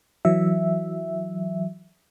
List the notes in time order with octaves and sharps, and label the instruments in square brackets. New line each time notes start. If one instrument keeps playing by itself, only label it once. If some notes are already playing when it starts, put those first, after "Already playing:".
[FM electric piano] E3 F#3 E5